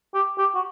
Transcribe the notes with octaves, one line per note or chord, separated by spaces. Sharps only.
G4
G4
F#4